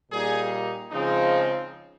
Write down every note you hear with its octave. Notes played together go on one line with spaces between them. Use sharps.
A#2 G3 A#3 D#4 G#4
C#3 F3 G#3 C4 D#4